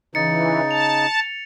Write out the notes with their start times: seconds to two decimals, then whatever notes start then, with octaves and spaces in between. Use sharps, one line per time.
0.15 C#3 E3 D#4 A6 C#7
0.71 A5 F7